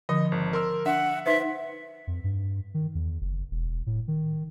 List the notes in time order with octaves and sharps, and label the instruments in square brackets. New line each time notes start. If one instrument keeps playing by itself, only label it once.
[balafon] D3 F3 [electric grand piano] D#5
[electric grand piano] G#1
A#4 C6 E6
[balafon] D4 [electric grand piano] E5 [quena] F#5
[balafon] D#4 B4 C5 [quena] E5
[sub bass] F2
G2
D#3
E2
F#1
E1
A2
D#3